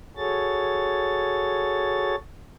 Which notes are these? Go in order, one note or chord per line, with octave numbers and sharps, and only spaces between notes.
F#4 G#4 A4 C#5 A6